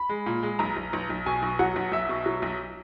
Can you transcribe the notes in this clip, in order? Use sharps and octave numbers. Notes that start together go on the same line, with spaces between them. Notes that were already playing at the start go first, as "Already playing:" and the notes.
Already playing: B5
G#3
A#2
G#3
B1 A#5
B1
B1
B1
B2 G#5
B1
F#3 F#5
B1
B1 E5
B2
F#3
B1